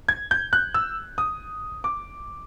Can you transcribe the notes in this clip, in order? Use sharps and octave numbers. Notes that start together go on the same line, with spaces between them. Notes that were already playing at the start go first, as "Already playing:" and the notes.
G#6
G6
F#6
E6
D#6
D6